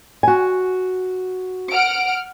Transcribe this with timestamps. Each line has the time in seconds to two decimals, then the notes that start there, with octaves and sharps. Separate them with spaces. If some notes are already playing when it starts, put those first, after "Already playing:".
0.23 F#4 G#5
1.71 F#5 F6 D7